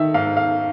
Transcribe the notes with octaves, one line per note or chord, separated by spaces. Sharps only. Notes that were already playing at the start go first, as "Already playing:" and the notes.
Already playing: D#3 E5
G#2 F5
F5